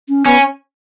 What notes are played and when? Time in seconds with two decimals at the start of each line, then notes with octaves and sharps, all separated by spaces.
0.09 C#4
0.26 B3 C#4